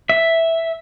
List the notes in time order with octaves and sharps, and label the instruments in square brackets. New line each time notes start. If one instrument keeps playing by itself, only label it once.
[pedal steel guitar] E5